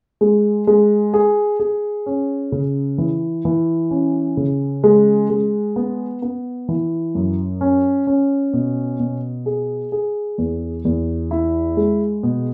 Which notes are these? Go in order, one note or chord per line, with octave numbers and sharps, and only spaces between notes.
G#3
G#3
G#4
G#4
C#4
C#3
E3
E3
C#4
C#3
G#3
G#3
B3
B3
E3
F#2
C#4
C#4
B2
B2
G#4
G#4
E2
E2
E4
G#3
B2